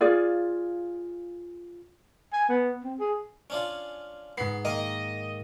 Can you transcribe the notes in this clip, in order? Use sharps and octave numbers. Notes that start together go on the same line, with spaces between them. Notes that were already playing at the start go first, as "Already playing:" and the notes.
F4 G#4 D5 F5
G#5
B3
C4
G#4
C#4 D4 F4
G#2 B3 C7
D#3 A#3 D#5